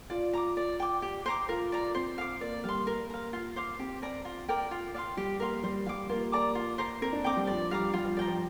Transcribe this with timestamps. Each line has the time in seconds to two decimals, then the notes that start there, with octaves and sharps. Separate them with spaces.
0.10 F4 D5
0.33 A#5 D6
0.57 D5
0.80 G5 D6
1.02 G4
1.26 C5 A#5 D6
1.49 F4 A#4
1.72 D5 A#5
1.95 C4 C5
2.18 F5 D6
2.41 A#3 D5
2.64 G3 F5 C6
2.87 A#3 A#4
3.10 F5 A#5
3.33 F4
3.56 C5 F5 D6
3.79 C4 G4
4.02 A#4 D5 A#5
4.25 F4
4.48 A#4 D5 G5
4.71 F4
4.94 D5 F5 C6
5.17 G3 G4
5.40 A#3 A#4 F5 C6
5.64 G3 C5
5.86 G3 F5 D6
6.09 A#3 F4
6.32 D5 A#5 D6
6.55 F4
6.78 C5 A#5 D6
7.02 C4 A#4
7.13 D4
7.24 C4 G5 A#5 D6
7.36 G3
7.47 F3 D5
7.71 G3 F5 A#5 D6
7.94 G3 F4
8.05 F3
8.17 D5 G5 A#5
8.28 F3